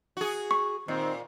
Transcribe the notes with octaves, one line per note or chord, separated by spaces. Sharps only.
F#4 G#4
C#6
A#2 D#3 C4